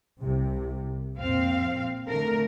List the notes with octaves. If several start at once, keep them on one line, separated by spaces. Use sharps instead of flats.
C2 C3
F2 A#2 C4 F5
D3 A3 A#4